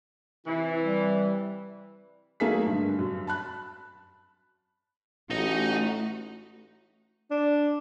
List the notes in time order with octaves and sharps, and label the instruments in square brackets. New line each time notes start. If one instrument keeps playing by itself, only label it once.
[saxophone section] C3 E3 [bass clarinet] E4
[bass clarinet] G3
[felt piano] F#3 A3 A#3 D#4 G#4 B6
G2 D3
F#2
A5 B5 F#6
[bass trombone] A1 [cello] A3 F#4 [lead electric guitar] D#4 D#5
[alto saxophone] D4